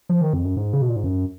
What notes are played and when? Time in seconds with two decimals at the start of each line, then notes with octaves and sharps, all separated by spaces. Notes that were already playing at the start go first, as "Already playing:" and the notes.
0.09 F3
0.21 D#3
0.33 F2
0.45 F#2
0.56 G#2
0.73 C#3
0.81 B2
0.89 A#2
0.96 G#2
1.04 F#2